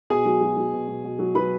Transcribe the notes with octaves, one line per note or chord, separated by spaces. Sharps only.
B2 G#4 G#5
F#3
F#3
F#3
B2
B2
B2
F#3
F#3 B4 B5